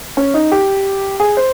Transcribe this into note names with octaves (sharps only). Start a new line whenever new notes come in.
C#4
D#4
G4
G#4
C5